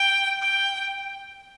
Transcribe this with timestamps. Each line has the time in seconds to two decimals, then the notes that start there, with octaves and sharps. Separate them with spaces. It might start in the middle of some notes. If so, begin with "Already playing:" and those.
Already playing: G5
0.42 G5